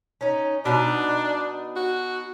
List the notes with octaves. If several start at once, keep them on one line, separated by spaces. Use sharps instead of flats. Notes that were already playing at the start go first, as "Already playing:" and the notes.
C#4 D#4
B2 D4 D#4
F#4